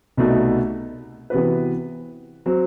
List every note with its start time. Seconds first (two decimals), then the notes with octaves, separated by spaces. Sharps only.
0.17 C2 B2 A3 D#4 F#4
1.30 C3 E3 B3 F#4 B4
2.46 F#3 C4